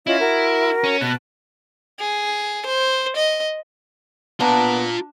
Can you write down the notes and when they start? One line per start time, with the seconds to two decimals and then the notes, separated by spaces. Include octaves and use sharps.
0.07 C#4 E4 F4 D#5
0.20 F#4 A#4
0.84 C#4
1.01 B2 A5 F#6
1.99 G#4
2.66 C5
3.16 D#5
4.40 B3 D4 F4 A#5